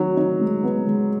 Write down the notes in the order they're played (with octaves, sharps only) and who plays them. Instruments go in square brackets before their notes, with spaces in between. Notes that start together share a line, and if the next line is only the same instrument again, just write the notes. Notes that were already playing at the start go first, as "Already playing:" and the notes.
Already playing: [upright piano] D#3 D#4 [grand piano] F#3
[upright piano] D#4
G#3
B3
G#3